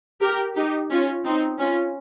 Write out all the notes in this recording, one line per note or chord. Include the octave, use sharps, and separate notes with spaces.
G4 A#4
D#4 G4
C#4 F4
C4 D#4
C#4 F4